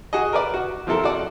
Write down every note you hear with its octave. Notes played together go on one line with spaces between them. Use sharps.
F#4 G#4 D#5
A#4 B4 D5
F#4
F3 C4 E4 A4 A#4
F#4 D5 F#5